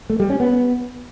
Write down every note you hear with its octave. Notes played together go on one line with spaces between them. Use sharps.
A3
G3
C#4
B3